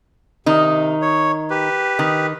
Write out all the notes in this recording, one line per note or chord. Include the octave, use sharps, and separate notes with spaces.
C3 D#3 D#4
C#5
G4 B4
D#3